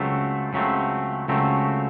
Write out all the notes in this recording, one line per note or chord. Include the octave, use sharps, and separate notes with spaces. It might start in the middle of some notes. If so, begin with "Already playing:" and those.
Already playing: C#2 C#3 F#3 A3 C4
C#2 C#3 F#3 A3 C4
C#2 C#3 F#3 A3 C4